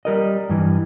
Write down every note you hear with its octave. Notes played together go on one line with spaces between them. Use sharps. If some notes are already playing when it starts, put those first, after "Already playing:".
G3 A#4 D#5
G2 E3